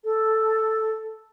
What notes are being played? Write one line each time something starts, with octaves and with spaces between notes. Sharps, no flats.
A4